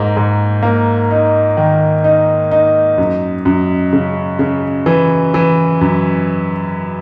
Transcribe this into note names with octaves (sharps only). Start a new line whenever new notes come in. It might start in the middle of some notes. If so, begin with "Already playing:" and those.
Already playing: G#2 A#3
G#2
A#3
D#4
D#3
D#4
D#4
F#2
F#2
C#3
C#3
E3
E3
F#2